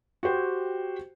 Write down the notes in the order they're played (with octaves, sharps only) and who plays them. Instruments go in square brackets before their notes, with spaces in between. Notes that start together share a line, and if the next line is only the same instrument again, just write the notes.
[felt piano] F#4 G4 C5 G5